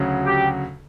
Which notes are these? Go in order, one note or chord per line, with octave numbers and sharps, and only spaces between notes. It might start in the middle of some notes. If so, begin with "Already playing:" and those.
Already playing: D2 C#3 F#3
G4